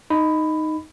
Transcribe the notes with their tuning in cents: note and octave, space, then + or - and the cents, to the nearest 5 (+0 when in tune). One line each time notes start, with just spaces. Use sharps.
D#4 +0 B5 +15